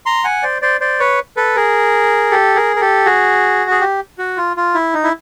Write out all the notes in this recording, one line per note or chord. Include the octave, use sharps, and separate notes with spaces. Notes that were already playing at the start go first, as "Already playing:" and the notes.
A#5 C6
F#5 G#5
C5 D5
C5 D5
C5 D5
B4 C#5
A4 B4
G#4 A#4
G4 A4
G#4 A#4
A#4
G4 A4
F#4 G#4
G#4
G4
F#4
F4
F4
E4
D#4
E4